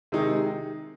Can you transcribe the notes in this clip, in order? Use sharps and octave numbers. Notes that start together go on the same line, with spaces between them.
C3 D#3 G#3 D#4 G#4